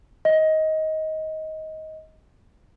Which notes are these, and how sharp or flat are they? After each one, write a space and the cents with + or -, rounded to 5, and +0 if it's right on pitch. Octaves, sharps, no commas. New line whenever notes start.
D#5 +15